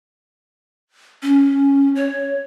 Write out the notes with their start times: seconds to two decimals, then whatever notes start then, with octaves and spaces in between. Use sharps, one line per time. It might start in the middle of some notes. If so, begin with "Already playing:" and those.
1.23 C#4
1.96 C#5